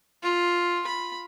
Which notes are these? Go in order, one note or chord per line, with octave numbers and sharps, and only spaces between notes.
F4
B5